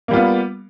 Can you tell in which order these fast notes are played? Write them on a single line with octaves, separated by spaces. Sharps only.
A#3 G3 F4 B3